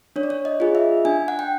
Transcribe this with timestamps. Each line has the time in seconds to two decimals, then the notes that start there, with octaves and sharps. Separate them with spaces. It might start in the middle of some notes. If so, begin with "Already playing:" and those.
0.16 D4 C#5
0.23 D5
0.30 C#5
0.45 D#5
0.60 F4 G#4
0.75 E5
1.05 D4 G#5
1.28 F#5
1.39 G5